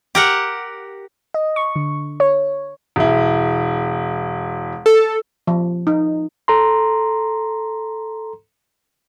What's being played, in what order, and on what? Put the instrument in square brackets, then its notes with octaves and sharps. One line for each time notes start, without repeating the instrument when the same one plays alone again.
[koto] G4 A#4 F#5
[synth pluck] D#5
C#6
D3
C#5
[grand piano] E1 E4
[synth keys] A4
[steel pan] F3
D#4
[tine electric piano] A4 A#5 C6